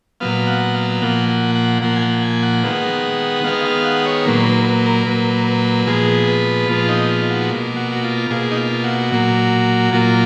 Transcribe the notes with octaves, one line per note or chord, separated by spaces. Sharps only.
A#2 F#3 B3 F5
F#5
F5
A#2 F3 A#3 F#5
F#5
F#5
A#2 F3 A#3 F#5
G#5
F#5
G#5
F#5
D#3 G#3 B3
D#3 G#3 B3 F5
F5
F#5
C#5
A#2 F#3 A#3 B4
B4
B4
A#4
A#2 F#3 A#3 B4
B4
A#2 F3 G#3 B3 G#4
B4
A#2 F3 G#3 B3 F4
D#4
F4
F#4
B2 A#3
F#4
F#4
F4
B2 A#3 G#4
D#4
F4
F#4
A#2 F#3 A#3
A#2 F#3 A#3 F4